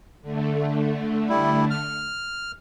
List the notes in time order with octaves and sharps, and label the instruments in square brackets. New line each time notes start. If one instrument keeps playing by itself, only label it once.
[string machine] D3 A3
[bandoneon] G3 E4
F6